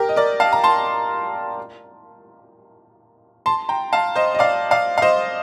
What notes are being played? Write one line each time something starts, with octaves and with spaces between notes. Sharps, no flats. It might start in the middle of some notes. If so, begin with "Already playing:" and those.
Already playing: G4 A#4
D#5
A#4 D5
F5 A5
A#5
A5 C6
A5 C6
G5 A#5
F5 A5
C5 D#5
D#5
D5 F5
D5 F5
F5
C5 D#5